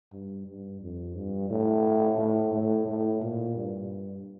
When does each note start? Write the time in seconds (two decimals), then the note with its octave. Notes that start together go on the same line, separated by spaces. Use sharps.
0.13 G2
0.47 G2
0.81 F2
1.16 G2
1.50 A2
2.18 A2
2.52 A2
2.87 A2
3.22 A#2
3.56 G2